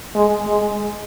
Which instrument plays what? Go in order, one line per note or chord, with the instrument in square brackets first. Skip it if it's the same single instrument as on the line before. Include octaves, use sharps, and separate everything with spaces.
[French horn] G#3
G#3